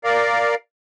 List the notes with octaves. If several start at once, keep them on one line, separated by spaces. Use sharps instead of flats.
A#4 D5 F5